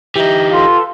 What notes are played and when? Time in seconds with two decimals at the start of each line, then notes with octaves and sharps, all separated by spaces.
0.16 E3 D#4 G4 E5 G5
0.52 F4 A4 B4 C6